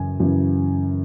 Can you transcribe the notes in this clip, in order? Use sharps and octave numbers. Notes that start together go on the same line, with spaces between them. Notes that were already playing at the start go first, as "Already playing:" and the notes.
Already playing: F#2 C#3 E3 G#5
F#2 C#3 E3